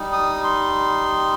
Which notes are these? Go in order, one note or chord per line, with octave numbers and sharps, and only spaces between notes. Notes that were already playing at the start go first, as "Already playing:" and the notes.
Already playing: G3 D#4
D#6
C6